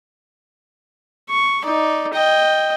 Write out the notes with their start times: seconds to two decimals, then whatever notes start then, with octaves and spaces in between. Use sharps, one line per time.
1.30 C#6
1.64 D#4 D5
2.14 D#5 G5